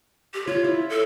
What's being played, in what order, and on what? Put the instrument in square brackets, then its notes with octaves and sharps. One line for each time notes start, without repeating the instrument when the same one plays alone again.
[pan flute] G4
[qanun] F4 [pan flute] C#5
[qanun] E4
[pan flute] A4